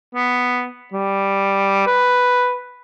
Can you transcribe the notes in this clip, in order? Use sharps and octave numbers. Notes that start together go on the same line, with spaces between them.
B3
G3
B4